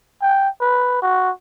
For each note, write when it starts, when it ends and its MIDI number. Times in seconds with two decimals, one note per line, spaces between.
0.22 0.49 79
0.61 1.00 71
1.02 1.31 66